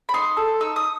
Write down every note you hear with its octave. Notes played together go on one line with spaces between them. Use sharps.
B5
D#4 C6
A4
D#4 E6
D#6